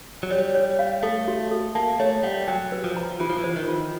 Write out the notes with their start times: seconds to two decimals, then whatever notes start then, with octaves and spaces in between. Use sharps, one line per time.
0.23 F#3
0.30 G3 C#5
0.55 C#5
0.79 F5
1.03 A3 A4
1.28 F#4
1.51 A4
1.75 A#3 A5
2.00 A3 C#5
2.23 G3 F#5
2.48 F#3 G5
2.72 B4
2.84 F3
2.97 A#5
3.20 E3 F4
3.29 F3
3.39 E3
3.44 C5
3.56 D#3
3.68 F4